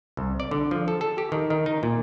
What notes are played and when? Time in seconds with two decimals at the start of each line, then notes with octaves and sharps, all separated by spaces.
0.17 C2
0.40 D5
0.51 D3
0.71 F3
0.88 A4
1.01 A4
1.18 G4
1.32 D#3
1.50 D#3
1.66 D#4
1.83 A#2